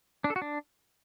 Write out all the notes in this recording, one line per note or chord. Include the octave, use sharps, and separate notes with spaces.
D4
A4
F#4
D4